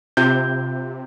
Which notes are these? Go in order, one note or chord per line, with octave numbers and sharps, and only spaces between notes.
C3 F4 G6